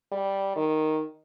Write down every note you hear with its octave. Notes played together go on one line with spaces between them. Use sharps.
G3
D#3